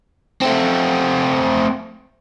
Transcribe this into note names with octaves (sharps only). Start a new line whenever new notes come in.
A3 C4